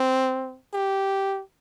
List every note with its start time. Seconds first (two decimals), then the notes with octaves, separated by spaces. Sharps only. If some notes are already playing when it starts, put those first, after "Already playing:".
Already playing: C4
0.74 G4